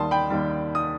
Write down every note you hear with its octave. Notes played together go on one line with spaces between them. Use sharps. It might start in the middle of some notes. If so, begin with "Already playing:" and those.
Already playing: D#2 D#3 G3 A5 C6 D#6
G5 B5
D#2 D#3 G3
D#6